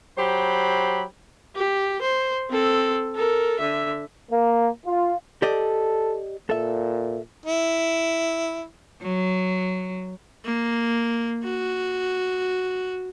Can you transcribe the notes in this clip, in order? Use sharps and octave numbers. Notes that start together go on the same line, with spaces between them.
F#3 G4 C5 B5
G4
C5
C4 A4
A4 A#4
D3 E5
A#3
F4
G4 A4 D5 D#5
A#2 A4 E5
E4
F#3
A#3
F#4